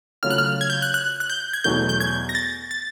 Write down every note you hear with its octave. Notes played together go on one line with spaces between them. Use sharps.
C#3 F#3 A3 C#4 F4 F6
F#6
F6
G#6
G6
F#6
F#6
F#6
G6
G#6
E2 B2 F#3 A3 G6
G6
G#6
A#6
A6
A6